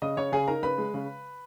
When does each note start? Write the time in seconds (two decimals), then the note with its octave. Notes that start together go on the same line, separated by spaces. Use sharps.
0.02 C#3 D#5 D#6
0.17 C#3 C#5 C#6
0.32 C#3 G#4 G#5
0.48 D#4 A#4 A#5
0.63 C#3 B4 B5
0.78 G#3
0.94 C#3